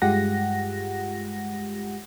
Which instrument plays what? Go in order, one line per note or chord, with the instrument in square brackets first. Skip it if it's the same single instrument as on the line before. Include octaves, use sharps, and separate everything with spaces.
[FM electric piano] G2 G#3 F4 G4 F#5 A#6